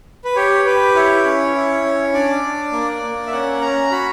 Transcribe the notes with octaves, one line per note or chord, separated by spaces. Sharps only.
B4
G4 C#5
G4 B4
E4 C#5
C#4
E4
C#4
D4 D5
D4
A#3
A#3
E5
C#4 F#5
C#4 A#5
F#4 B5